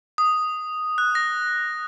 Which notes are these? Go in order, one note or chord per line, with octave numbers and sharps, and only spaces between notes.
D#6
F#6
A#6